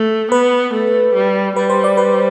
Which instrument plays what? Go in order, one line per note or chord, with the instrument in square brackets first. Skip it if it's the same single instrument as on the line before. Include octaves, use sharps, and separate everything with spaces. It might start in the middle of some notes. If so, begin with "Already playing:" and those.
Already playing: [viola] A3
[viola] B3 [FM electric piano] B4
[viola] A3
G3
[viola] G3 [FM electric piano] B4
[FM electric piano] C5
D5
B4